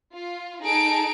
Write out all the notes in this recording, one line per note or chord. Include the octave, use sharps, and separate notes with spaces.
F4
D#4 G#4 A4 A5 D7